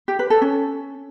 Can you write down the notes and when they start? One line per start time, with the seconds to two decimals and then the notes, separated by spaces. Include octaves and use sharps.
0.08 G4
0.19 B4
0.30 A4
0.42 C#4